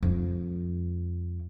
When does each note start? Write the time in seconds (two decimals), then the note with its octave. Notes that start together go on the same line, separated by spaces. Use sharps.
0.03 F2 G#3